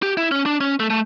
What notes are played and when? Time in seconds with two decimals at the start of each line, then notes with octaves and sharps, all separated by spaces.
0.03 G4
0.17 E4
0.31 C#4
0.46 D4
0.61 C#4
0.80 A3
0.90 A3